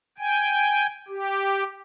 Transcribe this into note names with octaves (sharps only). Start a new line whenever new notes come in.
G5 G#5
G4